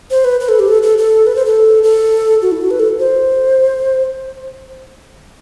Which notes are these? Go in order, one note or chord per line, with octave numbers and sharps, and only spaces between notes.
C5
B4
B4
A4
G4
A4
A4
A4
B4
C5
A4
A4
F#4
E4
F#4
B4
A4
C5